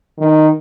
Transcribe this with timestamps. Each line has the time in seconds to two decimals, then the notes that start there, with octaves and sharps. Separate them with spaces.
0.18 D#3